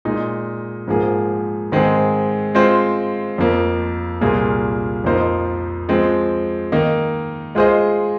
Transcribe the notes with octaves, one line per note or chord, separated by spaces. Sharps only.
A#2 G#3 D#4
G#2 F3 A#3 G#4
G#2 D#3 G#3 C4 G#4
G#3 C4 F4 C5
F2 F3 A#3
C2 A#2 A#3 F4 G#4
F2 F3 A#3 D#4 C5
F3 G#3 C4
D#3 A#3 D#4
G#3 F4 G#4 C5 D#5